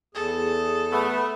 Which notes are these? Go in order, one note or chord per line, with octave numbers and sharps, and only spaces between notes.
E2 G#4 A4
A3 B3